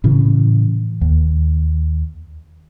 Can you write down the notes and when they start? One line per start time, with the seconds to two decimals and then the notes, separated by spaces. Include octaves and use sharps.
0.04 A2 C#3 E3
1.01 D#2